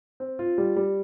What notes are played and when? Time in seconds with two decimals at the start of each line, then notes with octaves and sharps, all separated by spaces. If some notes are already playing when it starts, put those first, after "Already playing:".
0.20 C4
0.39 F4
0.58 G3
0.76 G3